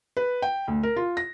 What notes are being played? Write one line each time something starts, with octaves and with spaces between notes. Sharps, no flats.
B4
G5
D2
A#4
F4
A#6